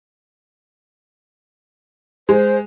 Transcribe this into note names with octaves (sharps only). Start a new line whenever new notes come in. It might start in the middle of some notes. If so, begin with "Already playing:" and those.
G#3 C5